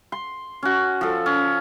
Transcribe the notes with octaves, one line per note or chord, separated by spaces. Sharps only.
C6
C#4 F#4
F3 A4
C#4